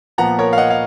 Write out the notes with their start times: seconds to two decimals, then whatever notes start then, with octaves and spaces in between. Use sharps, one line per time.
0.18 A#2 F3 B3 F#5 A#5
0.39 A#4 C#5
0.53 F5
0.58 D#5 F#5
0.70 F5